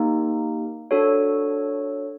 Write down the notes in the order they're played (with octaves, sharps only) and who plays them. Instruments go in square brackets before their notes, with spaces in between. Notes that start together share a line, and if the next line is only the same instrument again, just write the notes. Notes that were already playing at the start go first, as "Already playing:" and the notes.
Already playing: [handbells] A#3 D#4 G4 A#4
D4 F#4 A4 C#5